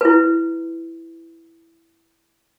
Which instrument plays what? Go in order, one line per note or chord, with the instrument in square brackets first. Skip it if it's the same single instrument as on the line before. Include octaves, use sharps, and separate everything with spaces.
[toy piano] E4 B4